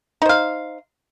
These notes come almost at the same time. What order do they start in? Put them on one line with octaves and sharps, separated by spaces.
D#4 C5 F5